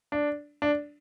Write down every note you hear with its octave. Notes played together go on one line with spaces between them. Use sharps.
D4
D4